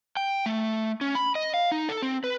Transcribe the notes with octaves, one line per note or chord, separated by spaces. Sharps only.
G5
A3
C#4
B5
D#5
F5
D#4
A4
C4
B4